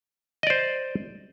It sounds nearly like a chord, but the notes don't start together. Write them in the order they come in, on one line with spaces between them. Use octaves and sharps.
D#5 D5 C5